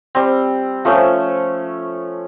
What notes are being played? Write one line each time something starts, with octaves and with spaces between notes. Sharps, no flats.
G3 C4
F3 A3 C#4 E6